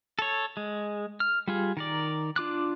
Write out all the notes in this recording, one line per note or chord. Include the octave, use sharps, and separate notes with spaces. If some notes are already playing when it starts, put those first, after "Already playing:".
A4 C#5
G#3
F6
G3 F4 G#4
D#3 A#4 D5
D4 F4 D6 F#6